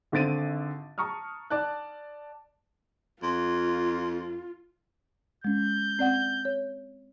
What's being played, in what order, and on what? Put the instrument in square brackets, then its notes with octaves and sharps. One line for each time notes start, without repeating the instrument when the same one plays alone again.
[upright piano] G#1 D3 C4 A6 D7 D#7
A5 A#5 C#6 D#6 F6
D5 A5 F#6
[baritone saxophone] F2 [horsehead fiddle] F4
[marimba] G#3 C#4 [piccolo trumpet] G6
[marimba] C4 D5 F#5
C#5